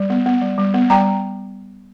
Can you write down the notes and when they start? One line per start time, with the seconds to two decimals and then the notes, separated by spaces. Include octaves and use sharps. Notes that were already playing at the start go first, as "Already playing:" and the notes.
Already playing: G3
0.10 B3
0.26 B3
0.42 G3
0.58 G3
0.74 B3
0.90 G3 G5 A#5